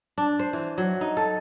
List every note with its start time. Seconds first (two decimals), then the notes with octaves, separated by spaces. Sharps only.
0.18 D4
0.39 C5
0.53 E3
0.78 F#3
1.01 D#4
1.17 A4